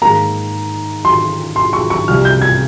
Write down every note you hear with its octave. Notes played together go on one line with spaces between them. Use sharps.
G#2 D#3 A#3 A#5
C6
C6
C#6
C#6
C2 C3 F3 F6
G6
G#6